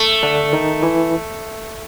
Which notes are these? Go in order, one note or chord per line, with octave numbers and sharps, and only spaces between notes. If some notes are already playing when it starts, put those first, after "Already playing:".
Already playing: A3
D3 D4
D#3 D#4
E3 E4